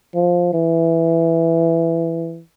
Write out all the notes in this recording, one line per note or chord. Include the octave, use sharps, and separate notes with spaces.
F3
E3